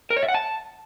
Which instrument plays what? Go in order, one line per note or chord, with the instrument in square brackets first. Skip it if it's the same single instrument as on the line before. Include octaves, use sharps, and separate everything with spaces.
[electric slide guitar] A#4
C#5
E5
F#5
A5